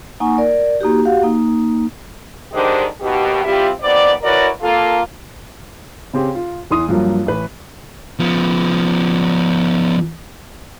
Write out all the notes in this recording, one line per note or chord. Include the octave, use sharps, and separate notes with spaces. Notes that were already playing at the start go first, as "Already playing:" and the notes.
A#3 D#4 F#5 G#5 C#6
A#4 D5
A#3 D#4 F#4 G4
F#4 G4 F5 F#5
A#3 D#4
D3 D#3 G#3 D4 G4 C5
D#2 B2 G4
G3 C4 E4 F4 G4
D#2 B3 C4 D5
E4 F#4 A#4 B4 C#5 D5
A#3 F4 A4
C#3 C4 G4 G#4
F4
E2 E3 C6 D#6
G2 F3 F#3 A#3
A1 B4
F3 B3